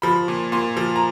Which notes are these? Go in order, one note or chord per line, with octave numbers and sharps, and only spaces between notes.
F3 B5
A#2
A#2 C6
F3
A#5